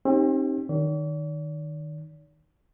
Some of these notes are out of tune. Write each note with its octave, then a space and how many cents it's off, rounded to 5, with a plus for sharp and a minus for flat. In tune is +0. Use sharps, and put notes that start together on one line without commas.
C4 +40 D#4 +0 G4 +0
D#3 -20 D5 -45